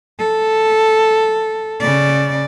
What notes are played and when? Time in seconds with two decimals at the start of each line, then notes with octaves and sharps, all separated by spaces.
0.19 A4
1.81 C#3 D5